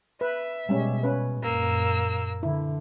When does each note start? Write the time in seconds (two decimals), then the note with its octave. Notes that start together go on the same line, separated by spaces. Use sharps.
0.21 B4 E5
0.69 B2 G3 G#3 C#4
1.03 C#4 B4
1.42 F#2 A#2 A#3 E6
2.43 D3 E4